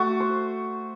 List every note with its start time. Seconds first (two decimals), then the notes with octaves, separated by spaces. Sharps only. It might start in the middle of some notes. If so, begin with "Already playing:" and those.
Already playing: A3 F#4
0.20 C5